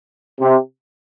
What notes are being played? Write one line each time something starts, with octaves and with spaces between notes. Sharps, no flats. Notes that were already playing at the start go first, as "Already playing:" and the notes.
C3